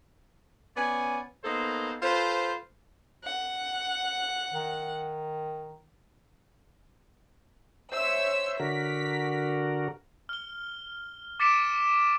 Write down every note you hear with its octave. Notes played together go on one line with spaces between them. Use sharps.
B3 C#4 D5 G#5
A#3 B3 D#4 A4 C5
F4 A4 B4 C5
F#5
D#3
C5 C#5 E5 E6
D3 F#4 A#4 B6
F6 G7
D6 A6 B6 C#7 D7 E7